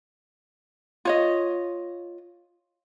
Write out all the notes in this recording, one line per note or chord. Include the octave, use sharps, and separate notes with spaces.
F4 C#5 D#5